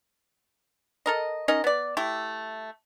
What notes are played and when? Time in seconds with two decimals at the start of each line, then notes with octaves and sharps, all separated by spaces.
1.06 A4 A#4 D#5
1.48 C#4 D#4 A#4 D#5
1.64 B3 D5
1.97 A3 E4 G4